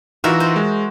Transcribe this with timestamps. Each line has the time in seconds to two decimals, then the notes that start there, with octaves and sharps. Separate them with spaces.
0.24 E3 D#4 F4 F#4 A#4 E5
0.40 C5
0.56 G#3